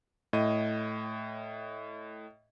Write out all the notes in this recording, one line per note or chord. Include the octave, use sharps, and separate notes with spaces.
A2 D#5 D#7